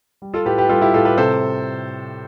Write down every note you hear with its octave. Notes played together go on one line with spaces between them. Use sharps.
G3
F4 A4
A2 G4 B4
G4 B4
G3 F4 A4
E4 G4
A2 F4 A4
G4 B4
C3 A4 C5